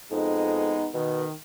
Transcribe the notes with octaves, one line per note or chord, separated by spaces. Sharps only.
F2 G#3 B3 D#4
B2 D#3